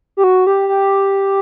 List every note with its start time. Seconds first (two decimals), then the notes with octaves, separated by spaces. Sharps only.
0.17 G4
0.24 F#4
0.47 G4
0.69 G4